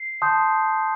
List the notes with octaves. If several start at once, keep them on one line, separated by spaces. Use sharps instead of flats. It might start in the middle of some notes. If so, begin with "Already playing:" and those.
Already playing: C7
A5 C6 D#6 G6